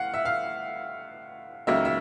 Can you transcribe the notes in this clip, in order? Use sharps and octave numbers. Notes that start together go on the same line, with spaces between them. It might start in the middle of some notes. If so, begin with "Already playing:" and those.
Already playing: A2 F5 F#5
E5
F5
C#2 C#3 F#3 A#3 D#4 E5
E5